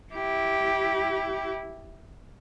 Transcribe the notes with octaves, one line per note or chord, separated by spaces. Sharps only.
E4 G4